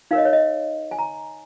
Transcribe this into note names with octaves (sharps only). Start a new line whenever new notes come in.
D#4 A#4 C#5 F5
D#5
C#5
D#5
G#5
A#5